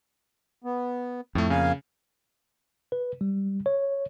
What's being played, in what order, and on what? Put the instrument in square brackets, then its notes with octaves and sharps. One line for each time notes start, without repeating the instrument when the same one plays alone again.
[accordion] B3
[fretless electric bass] F2 [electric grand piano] A2 A3
[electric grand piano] C#3 [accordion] A#3 F5 G#5
[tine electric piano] B4
G3
C#5